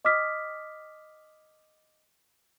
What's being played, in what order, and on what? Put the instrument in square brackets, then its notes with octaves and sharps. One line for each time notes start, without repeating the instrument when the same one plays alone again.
[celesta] D#5 D6 D#6 F6 B6